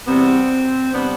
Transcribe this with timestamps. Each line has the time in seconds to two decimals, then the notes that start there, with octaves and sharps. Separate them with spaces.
0.06 E2 C3 G3 B3 C4
0.92 C3 G3 B3 D4